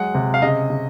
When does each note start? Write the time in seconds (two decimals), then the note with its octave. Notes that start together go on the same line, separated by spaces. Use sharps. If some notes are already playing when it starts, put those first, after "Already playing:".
Already playing: F#3 G#3 F#5
0.15 C3
0.34 F5
0.42 C#3 D#5
0.70 C#3